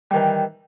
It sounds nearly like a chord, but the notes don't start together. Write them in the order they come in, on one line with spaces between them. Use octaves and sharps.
G3 D#3 E3